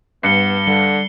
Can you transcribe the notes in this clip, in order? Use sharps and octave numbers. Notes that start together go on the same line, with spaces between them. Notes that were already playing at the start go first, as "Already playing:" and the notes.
G2 B3 C7 C#7 G7
D3 G3 G7